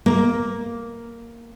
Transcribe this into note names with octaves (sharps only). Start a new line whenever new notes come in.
A#3